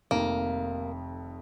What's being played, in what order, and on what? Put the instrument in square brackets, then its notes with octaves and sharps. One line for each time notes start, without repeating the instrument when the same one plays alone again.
[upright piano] F1 F2 D#3 [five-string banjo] A#3